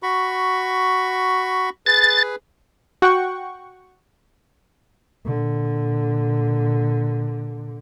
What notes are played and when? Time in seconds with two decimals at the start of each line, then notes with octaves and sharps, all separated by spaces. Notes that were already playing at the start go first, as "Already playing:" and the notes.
0.03 F#4 B5 C#6
1.86 G#4 B4 A6
3.02 F#4 F#5 G5 C#6
5.26 A#2 D3